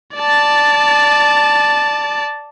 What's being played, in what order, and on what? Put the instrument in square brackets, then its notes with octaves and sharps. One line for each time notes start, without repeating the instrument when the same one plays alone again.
[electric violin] D5 A5